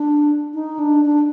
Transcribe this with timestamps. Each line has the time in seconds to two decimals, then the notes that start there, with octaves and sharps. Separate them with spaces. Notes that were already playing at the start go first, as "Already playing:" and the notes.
Already playing: D4
0.54 D#4
0.79 D4
1.05 D4